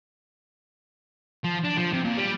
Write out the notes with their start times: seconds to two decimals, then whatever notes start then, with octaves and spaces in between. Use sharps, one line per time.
1.44 F3
1.65 D4
1.77 F3
1.93 C3
2.05 A#2
2.17 G3